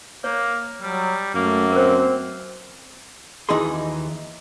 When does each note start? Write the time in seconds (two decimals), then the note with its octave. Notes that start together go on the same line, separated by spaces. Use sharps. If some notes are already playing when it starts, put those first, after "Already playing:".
0.24 A#3 C#5
0.82 F#3 G3
1.34 F#2 A3 A#3
1.72 C4 A#4 C5
3.49 D#2 E3 D#4 F#4 G#4 C6